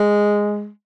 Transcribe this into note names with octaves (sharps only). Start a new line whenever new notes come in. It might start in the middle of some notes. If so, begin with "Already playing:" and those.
Already playing: G#3